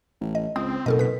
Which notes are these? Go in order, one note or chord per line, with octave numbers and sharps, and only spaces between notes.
A1
D#5
C#2 C4 D#6
F#1 B2 A4 A#4 D#5
B4 B6